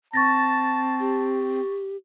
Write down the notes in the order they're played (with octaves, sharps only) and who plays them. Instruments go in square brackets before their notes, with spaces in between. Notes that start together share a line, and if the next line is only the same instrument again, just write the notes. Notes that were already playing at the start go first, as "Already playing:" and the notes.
[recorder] C4 [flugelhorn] A5 [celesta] C#6 A6 A#6
[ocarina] G4